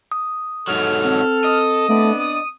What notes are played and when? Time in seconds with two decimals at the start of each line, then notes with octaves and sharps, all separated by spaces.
0.12 D#6
0.67 G#2 F#3 A4 F6
1.05 C4
1.44 D#5
1.89 A3 B3 D4 D5
2.18 D#6